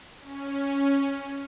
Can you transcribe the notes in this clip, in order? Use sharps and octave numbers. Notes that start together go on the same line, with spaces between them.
C#4